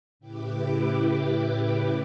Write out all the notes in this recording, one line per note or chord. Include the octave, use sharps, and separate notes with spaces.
A2 C#3 E4 G4 B4 D6